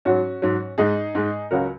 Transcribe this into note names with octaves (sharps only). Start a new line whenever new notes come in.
G#2 F#3 C#4 F#4
G#2 F#3
G#2 G#3 D#4 G#4
G#2 G#3
C#2 C#3 F#3 F#4 A#4